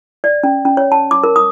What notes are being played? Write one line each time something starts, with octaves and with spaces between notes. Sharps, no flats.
D5
C#4
C#4
C#5
A5
D6
A#4
D#6